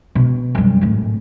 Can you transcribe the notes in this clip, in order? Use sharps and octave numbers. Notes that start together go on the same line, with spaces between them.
B2
F#2 G3
G#1 A2